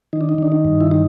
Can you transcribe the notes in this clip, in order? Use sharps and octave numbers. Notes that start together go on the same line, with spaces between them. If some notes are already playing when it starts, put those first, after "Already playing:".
D#3 D#4
D4
D#4
D#3 D4
D#4
G2
E4
D#4